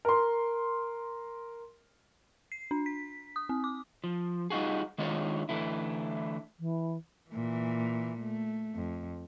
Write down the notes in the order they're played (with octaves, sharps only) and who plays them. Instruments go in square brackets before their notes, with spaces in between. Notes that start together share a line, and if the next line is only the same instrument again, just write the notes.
[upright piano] A#4 C6
[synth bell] C7
D4
B6
D#6
C4
D6
[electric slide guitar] F3
G3 D#4 F4 F#4 G#4
D#3 G#3 D4 F4 C#5
D3 E3 A3 E4
[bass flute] E3
[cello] A#2 E3
A3
F2